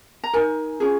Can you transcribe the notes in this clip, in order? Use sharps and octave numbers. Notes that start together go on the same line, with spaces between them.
A#5
D#4 A#4 G#5
C#4 F4 G#4